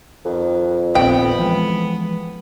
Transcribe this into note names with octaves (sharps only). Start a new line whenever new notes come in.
F2 D#3
A#1 D#2 B3 C4 G5
E3 F3 G#3